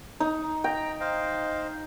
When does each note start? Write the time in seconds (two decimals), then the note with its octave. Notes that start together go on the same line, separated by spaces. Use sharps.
0.20 D#4
0.64 G5 A#5
1.00 C5 D#5 F5